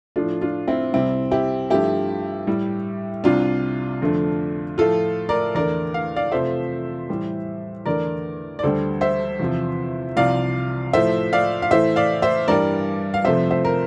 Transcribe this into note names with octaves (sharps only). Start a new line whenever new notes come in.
A2 F3 A3 D4 F4
D4 F4
C4 E4
C2 C3 G3 C4 E4
E4 G4
G2 F3 A3 E4 G4
A2 G3
C2 C3 G3 D4 F4
F2 D3 A3
A2 F3 A3 F4 A4
A#4 D5
E2 D3 A3 A#4 D5
F5
D5 F5
F2 C3 F3 A3 C5 E5
A2 E3 G3
E2 D3 A3 A#4 D5
D5
D2 D3 G3 A4 C5
C5 E5
E2 C3 F3
C2 C3 F3 D5 F5
A2 F3 A3 C5 E5
D5 F5
F5
A2 E3 A3 C5 E5
D5 F5
C5 E5
G2 E3 G3 A#4 D5
F5
F2 C3 F3 A3 C5 E5
C5 E5
A#4